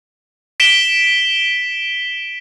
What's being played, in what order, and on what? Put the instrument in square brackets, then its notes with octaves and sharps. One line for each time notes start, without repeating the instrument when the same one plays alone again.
[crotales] B6 D7 E7 G7